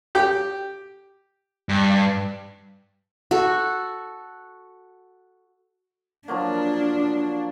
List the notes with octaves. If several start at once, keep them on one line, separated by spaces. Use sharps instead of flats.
G4 G5
G2
F#4 A4
F3 F#3 A#3 D4